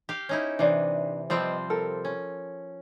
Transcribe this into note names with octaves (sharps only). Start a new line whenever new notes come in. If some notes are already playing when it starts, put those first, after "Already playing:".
G4 F5
C#4 D#4 E4
C3 E3 D4 D#4 D5
F3 G3 C4 G4 B4 D#5
A4 A#4
C#4